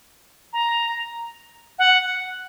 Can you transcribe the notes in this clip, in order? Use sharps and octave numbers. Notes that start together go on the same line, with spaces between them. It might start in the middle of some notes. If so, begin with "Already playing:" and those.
A#5
F#5